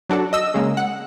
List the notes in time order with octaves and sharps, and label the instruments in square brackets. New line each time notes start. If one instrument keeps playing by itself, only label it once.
[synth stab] F#3 D4 F#4 A4
D#5 E6
C#3 G#3 A#3
F#5